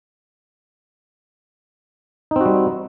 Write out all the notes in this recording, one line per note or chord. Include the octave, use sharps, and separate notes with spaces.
G3 C4 D#4 F#4